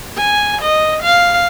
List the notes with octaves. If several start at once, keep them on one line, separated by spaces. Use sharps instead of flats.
G#5
D#5
F5